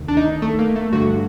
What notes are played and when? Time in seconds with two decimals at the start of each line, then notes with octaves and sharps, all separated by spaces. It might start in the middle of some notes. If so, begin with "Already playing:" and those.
Already playing: D2 C3 D#3
0.08 D4
0.17 D#4
0.42 A3
0.59 A#3
0.76 A3
0.92 G2 D3 F#4